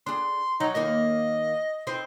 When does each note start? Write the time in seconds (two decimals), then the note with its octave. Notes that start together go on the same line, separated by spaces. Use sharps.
0.06 D4 G#4 C6
0.60 F#3 D#4
0.75 D#2 A#3 D#4 D#5
1.87 C4 D#4 C5